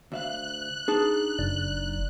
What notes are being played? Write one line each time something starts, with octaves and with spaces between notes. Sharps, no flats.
D2 E5 F5 F#6
D4 D#4 G#4 A5
F#1 D5